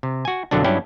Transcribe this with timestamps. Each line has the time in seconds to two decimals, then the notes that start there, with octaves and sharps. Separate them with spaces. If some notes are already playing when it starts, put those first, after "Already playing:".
0.03 C3
0.25 F#4 G#5
0.51 F2 B2 D3 F#3 D4
0.64 G2 F#3 C#4 E4 D5 G5